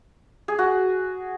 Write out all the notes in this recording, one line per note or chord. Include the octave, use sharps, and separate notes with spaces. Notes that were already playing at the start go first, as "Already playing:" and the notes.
G#4
F#4